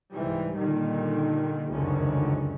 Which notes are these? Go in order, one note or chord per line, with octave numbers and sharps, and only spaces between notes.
C2 G#2 E3 G3
A#2 D3 D#3 G3
F1 C#2 F#2 D3 D#3 C#4